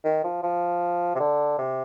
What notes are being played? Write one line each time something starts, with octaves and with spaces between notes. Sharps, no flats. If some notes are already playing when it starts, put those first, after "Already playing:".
D#3
F3
F3
C3
D3
C3